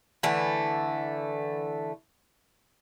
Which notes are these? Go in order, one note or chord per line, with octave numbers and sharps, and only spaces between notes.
D3 E3 A3